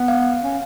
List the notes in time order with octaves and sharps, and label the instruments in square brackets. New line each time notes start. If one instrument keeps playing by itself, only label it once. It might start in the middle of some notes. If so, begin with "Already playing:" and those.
Already playing: [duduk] B3
[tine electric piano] F5
[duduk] C#4